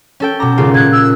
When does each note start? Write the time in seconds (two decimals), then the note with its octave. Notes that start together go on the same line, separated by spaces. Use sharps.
0.20 C#4 A4 G5
0.40 B2 A#5 D6
0.57 G#1 C#3 F4
0.74 A#2 F#6 G#6
0.92 E6